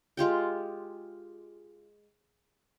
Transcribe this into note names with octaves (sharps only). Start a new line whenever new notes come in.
G#3 F4 G4 G5